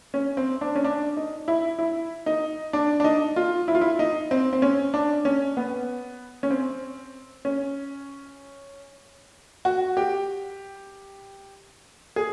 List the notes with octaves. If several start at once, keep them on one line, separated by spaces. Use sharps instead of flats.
C#4
C4
D4
C#4
D4
D#4
E4
E4
D#4
D4
D4
D#4
F4
E4
F4
E4
D#4
C4
C4
C#4
D4
C#4
B3
C#4
C4
C#4
F#4
G4
G#4